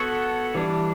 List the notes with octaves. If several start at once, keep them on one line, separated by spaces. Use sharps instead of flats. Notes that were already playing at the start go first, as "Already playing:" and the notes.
Already playing: B3 F#4 A4 C#5
E3 G3 D4